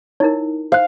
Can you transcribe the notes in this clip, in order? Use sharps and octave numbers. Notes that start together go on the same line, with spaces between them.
D#4 E4 A#4 C#5
C5 F5 F#6